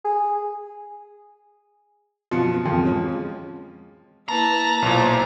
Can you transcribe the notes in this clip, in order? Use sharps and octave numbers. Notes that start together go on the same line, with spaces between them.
G#4
F#2 B2 F3 C#7
E1 F2 F3
G#3 C#4
A#3 E4 B4 A5 A#5
B1 A#2 E4 C5